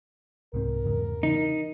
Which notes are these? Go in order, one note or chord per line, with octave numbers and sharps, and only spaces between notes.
C2 G#2 C4 A#4
E2 G#2 C#3
C#3 E3 D#4